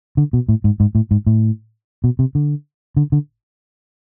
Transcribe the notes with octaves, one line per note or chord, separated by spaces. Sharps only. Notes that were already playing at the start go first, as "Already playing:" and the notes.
D3
B2
A2
G#2
G#2
A2
G#2
A2
B2
C3
D3
D3
D3